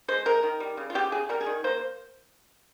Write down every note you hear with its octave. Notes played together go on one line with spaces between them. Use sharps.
G#3 C5
G#3 A#4
D#3
G3
C#3
F4
C#3 G4
C#3 G#4
G3 A#4
G#4
D#3
A#3 C5